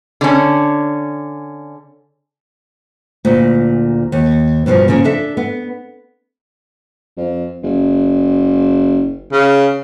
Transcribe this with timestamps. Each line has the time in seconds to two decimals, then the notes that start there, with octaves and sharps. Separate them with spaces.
0.21 D3 C#4
3.25 D2 A#2
4.12 D#2
4.66 G2 B2 D#3 F3
4.88 C#3 F3 A#3
5.04 D4 A4 E5
5.37 B3
7.17 F2
7.63 F#1
9.32 C#3